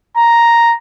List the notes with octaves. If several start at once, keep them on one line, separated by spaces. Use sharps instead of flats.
A#5